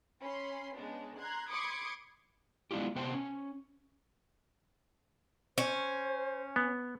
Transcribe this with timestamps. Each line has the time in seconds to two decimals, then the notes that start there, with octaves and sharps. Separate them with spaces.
0.22 C#4 B5 C6
0.75 C#3 G#3 B3 D4
1.18 A#5 C6 F#6 G#6
1.48 B5 C6 D6 D#6 G#6 C#7
2.71 G#3 B3 D4 E4 F4 G4
2.96 C3 B3 C5 G5 A5
3.13 C#4
5.58 C#4 C5
6.56 B3